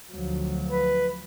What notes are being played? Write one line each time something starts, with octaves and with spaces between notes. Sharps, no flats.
D2 F3 F#3
B4